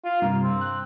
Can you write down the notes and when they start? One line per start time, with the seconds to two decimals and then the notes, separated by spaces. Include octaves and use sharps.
0.04 F4
0.22 G2 C3 A#3
0.41 C4
0.61 F#6